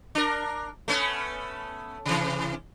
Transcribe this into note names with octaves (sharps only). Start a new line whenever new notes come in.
D4 A#4
A3 B3 C#4
C3 E3